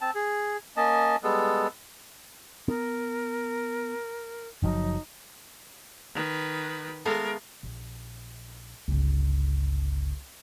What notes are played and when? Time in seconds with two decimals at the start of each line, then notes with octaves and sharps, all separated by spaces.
0.01 C4 A5
0.15 G#4
0.77 A#3 C#4 D#5 A5
1.23 G3 G#3 B3 A4
2.68 B3 A#4
4.62 F#1 F3 F#3 D#4
6.14 D#3 B4
7.05 G#3 A3 B3 A#4 F5
7.63 A#1
8.88 G1 C#2